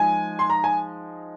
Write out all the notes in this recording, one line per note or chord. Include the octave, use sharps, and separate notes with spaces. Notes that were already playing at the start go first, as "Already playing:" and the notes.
Already playing: F3 G#3 D#4 G#5
C6
A#5
G#5